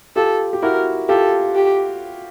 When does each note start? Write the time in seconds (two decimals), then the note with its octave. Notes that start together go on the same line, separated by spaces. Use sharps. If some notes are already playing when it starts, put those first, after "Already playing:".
0.16 F4 G4 A4
0.53 G4
0.63 E4 F#4 A#4
1.09 F4 G4 A4
1.55 G4